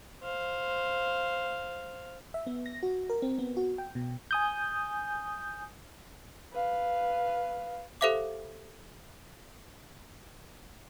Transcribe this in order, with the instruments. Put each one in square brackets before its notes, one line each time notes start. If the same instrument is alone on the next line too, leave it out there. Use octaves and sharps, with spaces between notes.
[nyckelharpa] C5 F5
[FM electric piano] E5
B3
A#6
F#4
A#4
C4
B3
F#4
G5
B2
G#5 D#6 G6
[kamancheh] B4 F5
[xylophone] G4 A4 C5 E5 F5 D6